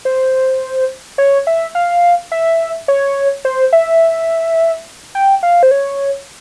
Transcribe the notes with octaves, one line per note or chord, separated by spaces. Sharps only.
C5
C#5
E5
F5
E5
C#5
C5
E5
G5
F5
C5
C#5